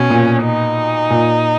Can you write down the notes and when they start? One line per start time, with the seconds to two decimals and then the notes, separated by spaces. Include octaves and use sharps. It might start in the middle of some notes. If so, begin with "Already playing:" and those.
Already playing: B2 C#4
0.10 A#2
0.43 D#4
1.10 A#2